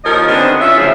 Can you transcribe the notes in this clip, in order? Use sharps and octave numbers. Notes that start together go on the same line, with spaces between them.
D#2 F3 D#4 A#4 C#5 D#5
D3 D#3 G#3 B3 C4 D4
E3 C#4 F4 E5
D2 C#3 F3